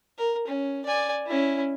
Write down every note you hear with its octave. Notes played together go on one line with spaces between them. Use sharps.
A#4
C#4
D5 G#5
C#4 E4